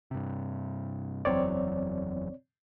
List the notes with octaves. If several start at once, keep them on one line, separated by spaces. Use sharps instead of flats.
G2 C3
F#1 E2 F#3 C4 C#5 D5